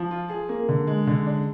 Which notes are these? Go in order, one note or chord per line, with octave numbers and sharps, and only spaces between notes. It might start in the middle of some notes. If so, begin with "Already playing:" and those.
Already playing: F3
F4
G#4
A#3
D3
G#3
D3
D4